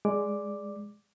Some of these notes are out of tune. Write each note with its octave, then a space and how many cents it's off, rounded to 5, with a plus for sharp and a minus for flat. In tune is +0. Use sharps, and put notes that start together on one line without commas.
G#3 +0 D5 +0 D6 +0